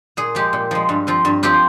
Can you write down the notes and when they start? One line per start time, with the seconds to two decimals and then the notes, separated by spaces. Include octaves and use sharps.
0.17 A#2 G#4
0.35 F3 G#3 G4
0.53 A#2
0.71 F3 G#3
0.89 G2
1.07 F3 C4 F4
1.25 G2
1.43 F3 C4 F4 G4